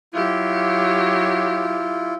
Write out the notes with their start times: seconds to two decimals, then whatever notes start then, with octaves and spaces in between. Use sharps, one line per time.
0.14 F#3 E4 F4 G4